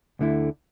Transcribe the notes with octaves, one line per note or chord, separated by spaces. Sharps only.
D2 D3 A3 E4